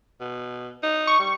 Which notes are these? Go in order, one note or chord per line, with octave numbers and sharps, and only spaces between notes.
B2
D#4
C#6
G3